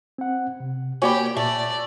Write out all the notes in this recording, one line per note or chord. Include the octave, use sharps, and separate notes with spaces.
C4 F#5
C3
A#3 F#4 G4 C#5 D5 G#5 B5
A#2 A3 D5